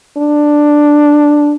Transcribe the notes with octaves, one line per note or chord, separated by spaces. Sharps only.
D4